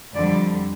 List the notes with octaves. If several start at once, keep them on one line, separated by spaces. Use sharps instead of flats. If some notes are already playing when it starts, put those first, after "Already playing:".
F2 D3 G3 D5